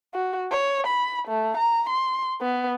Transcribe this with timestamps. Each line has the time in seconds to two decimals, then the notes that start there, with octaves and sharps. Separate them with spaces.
0.14 F#4
0.51 C#5
0.87 B5
1.28 A3
1.57 A#5
1.89 C6
2.41 B3